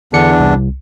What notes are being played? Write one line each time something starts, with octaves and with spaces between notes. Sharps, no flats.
E2 D3 D4 C#7
C2